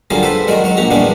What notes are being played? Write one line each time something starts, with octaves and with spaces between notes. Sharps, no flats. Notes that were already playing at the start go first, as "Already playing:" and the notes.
D3 F#3 G3 F4 G#4 A#4
G4 A4 B4 C5
D#3 F#3 G#3 A#4 D5
F#3 C#5
A#1 F#4 G4 A#5
E3 G3 G#3 A#3 B3 D4